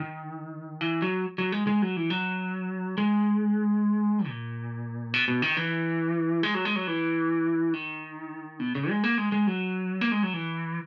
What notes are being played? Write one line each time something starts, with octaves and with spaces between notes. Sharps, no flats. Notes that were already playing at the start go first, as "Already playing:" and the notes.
Already playing: D#3
E3
F#3
F#3
G#3
G#3
F#3
E3
F#3
G#3
A#2
B2
B2
D#3
E3
G#3
F#3
G#3
F#3
E3
D#3
B2
C#3
G#3
A#3
G#3
G#3
F#3
A#3
G#3
F#3
E3